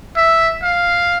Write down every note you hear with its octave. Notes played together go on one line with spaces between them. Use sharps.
E5
F5